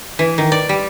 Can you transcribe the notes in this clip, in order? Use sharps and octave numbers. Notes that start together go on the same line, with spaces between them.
E3
D#3
D5
G3